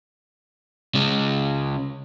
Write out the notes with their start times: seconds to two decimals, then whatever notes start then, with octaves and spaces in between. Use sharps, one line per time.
0.95 C#3 G#3